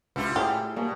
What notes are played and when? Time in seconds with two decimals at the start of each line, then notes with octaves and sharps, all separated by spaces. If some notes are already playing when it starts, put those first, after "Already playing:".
0.16 C#2 G3 E4 F4 B4 F#5
0.36 A2 G4 G#4 A#5
0.76 B2 G3 A#3